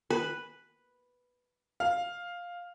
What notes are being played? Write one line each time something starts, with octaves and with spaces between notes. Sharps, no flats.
B4
F5